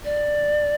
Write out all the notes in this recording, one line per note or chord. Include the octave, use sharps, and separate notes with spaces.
D5